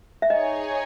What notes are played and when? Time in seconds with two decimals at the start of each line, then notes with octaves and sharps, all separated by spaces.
0.22 E5
0.30 D#4 G#4 C#5 D#5 G#5